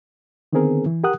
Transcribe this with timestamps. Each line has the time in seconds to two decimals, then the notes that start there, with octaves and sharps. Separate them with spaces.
0.53 D3 D#3 B3 C4 G#4 A#4
0.86 E3
1.04 G4 A#4 F#5 D#6 F#6